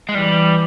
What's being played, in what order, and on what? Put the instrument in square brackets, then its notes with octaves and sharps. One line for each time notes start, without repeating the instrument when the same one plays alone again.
[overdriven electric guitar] G#3
[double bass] E3 [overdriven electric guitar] G3